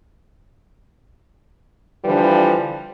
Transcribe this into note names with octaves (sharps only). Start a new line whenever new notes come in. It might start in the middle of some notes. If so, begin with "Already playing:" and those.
D3 E3 F3 G3 D4 B4